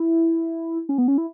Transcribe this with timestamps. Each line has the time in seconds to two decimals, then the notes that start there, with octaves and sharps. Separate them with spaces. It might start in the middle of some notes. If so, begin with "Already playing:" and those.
Already playing: E4
0.89 C#4
0.98 B3
1.08 C#4
1.18 E4